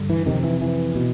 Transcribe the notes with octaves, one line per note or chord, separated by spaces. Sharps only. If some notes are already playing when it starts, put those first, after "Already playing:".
Already playing: G2 D3
E3
F2 C3 D#3
E3
E3
B2